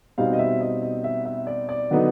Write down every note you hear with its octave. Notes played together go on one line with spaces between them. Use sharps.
B2 G3 C4 D#4 F5
D#5
E5
D#5
D#5
E5
E5
D5
D5
D3 F#3 B3 D#4